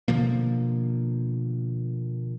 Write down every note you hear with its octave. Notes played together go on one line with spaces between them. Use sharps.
B2 D3 F3 A#3